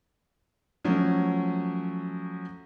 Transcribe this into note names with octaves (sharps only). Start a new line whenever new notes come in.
F3 F#3 A3 C#4